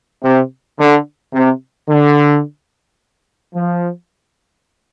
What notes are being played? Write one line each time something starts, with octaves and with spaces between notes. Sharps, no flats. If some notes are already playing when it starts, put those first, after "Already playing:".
C3
D3
C3
D3
F3